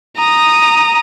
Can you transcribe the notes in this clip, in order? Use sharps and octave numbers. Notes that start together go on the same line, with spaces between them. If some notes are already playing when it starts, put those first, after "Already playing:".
A#5 D#6